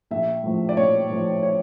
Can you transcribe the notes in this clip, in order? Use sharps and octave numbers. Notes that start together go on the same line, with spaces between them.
A#1 E5
A2 F3
D5
A#1 C#5
A2 F3
C#5